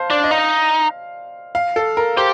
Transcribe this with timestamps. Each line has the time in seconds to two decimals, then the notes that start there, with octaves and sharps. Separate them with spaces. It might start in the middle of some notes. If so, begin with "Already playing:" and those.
Already playing: C5 F5 A5
0.10 D4 D5
0.24 D#5
0.31 D#4 F5
1.55 F5
1.76 A4
1.97 A#4
2.17 G4 C5